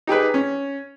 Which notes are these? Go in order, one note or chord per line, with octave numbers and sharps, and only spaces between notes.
D#4 G4 G#4 B4
C#4